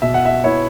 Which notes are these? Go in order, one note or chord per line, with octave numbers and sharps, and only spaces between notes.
B2 E5
F#5
E5
B3 E4 C#5